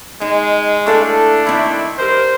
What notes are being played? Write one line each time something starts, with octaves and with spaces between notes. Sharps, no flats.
G#3 D#4
A3 D4 E4 A4 F5
D#3 C4 E4
G3 A#4 C5